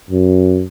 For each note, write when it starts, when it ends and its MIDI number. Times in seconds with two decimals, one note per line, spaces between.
0.10 0.64 42